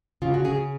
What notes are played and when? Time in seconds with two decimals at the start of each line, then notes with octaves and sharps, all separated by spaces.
0.22 C#3 F4
0.34 F#4
0.44 C#3 G#4